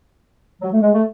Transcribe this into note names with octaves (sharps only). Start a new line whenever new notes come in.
F#3
A3
G#3
A3